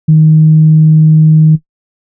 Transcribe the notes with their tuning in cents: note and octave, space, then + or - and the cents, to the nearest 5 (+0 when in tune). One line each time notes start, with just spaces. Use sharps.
D#3 +10